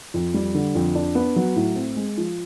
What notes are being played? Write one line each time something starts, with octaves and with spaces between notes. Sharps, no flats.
F2
G3
D3
F2
D4
B3
F#3
A2
C4
G#3
F3